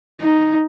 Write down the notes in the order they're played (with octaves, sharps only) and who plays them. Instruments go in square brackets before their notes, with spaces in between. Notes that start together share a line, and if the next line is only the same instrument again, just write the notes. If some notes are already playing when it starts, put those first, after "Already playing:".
[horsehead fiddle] D#4